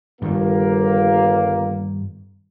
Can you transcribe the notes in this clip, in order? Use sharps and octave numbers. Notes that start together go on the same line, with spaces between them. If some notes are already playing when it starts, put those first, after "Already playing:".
G1 G2 D#3 G3 A#3